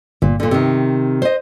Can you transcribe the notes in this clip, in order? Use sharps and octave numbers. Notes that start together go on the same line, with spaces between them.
G1 A#2
A#2 D3
C3 D#3
C5 D#5